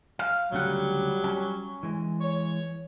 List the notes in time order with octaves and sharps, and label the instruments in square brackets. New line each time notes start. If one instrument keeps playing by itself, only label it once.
[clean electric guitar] F5
[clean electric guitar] D2 C#3 F#5 [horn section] F#3 G3 G4
[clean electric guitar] C#4
E3 G#3
[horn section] C#5